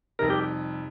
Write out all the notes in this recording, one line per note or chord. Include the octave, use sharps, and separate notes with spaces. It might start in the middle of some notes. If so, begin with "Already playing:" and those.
F2 C3 G3 D#4 A#4
G4